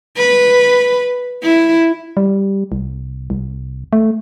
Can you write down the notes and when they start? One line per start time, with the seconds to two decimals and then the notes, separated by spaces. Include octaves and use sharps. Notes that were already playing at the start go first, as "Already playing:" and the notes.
0.17 B4
1.43 E4
2.17 G3
2.72 C2
3.30 C2
3.93 A3